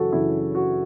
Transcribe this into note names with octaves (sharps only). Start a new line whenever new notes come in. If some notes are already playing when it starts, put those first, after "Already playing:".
Already playing: F#2 C#3 E3 F#4 A4
F#2 C#3 E3 E4
F#4